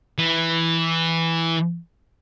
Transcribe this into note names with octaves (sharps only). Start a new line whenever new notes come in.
E3